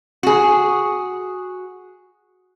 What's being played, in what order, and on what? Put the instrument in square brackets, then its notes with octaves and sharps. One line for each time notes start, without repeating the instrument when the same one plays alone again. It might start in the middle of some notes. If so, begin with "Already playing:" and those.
[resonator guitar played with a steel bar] F#4 G#4